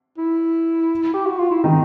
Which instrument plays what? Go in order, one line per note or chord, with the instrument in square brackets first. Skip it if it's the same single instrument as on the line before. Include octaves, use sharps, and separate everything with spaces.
[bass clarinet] E4
G4
F#4
F4
E4
[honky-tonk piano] D#3 [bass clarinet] D#4